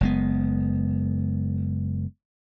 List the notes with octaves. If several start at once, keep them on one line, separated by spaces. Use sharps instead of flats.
F#1 G#3 B3